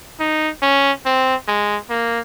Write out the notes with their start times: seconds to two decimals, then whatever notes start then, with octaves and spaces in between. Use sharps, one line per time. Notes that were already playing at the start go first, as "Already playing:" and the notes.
0.20 D#4
0.63 C#4
1.06 C4
1.48 G#3
1.90 A#3